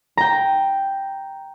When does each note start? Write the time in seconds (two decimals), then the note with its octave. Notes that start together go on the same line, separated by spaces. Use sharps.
0.17 G5 A#5